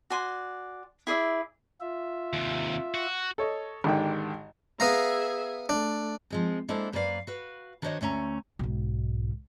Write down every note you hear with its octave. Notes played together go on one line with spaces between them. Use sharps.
F#4 D5 G#5 C6
E4 G#4 D5 E5
F4 E5
D#2 C3
F#4
A4 C#5 D#5
G#1 G#2 D3 D#3 G4 G5
B3 G#4 E5 F5 A#5
A3 D4
F3 G#3 C4
G#3 A#3 D4 E4 A4 C5
F#2 A#3 B4 C5 D5 F5
F#4 B4 F5
D#3 D4 F#4 C5 C#5 D#5
D2 A3 C#4 E5 A#5
B1 G#2